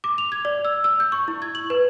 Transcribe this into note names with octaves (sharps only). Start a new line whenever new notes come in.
D6
F7
G#6
D5
E6
E6
G6
C#6
E4
G#6
F#7
B4